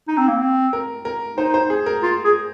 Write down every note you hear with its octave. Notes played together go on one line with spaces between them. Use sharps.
D#4
C4
A#3
C4
A#4
A#4
D#4 C5
C5
G#4
A#4
F4
G#4